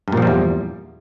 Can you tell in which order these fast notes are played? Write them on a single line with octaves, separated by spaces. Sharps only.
G2 A#2 F3 G3 E2